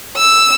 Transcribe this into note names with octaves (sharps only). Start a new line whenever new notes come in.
E6